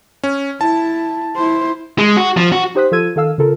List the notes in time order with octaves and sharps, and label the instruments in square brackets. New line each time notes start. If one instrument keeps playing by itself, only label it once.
[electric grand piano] C#4
[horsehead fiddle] E4 [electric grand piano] A5
[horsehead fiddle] E4 C5
[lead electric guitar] G#3
F#4
F3
F#4
[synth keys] D#4 G4 C5 D#6 F#6 B6
F3 F4 A4 E6 G#6 D#7
D#3 A4 F5 E6
C#3 F4 A4 A#4